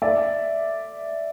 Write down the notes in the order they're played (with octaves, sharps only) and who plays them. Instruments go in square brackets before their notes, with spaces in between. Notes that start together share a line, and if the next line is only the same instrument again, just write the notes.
[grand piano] D5 E5